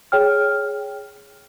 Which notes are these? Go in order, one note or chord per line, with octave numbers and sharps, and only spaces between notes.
G#4 C#5 G5 F6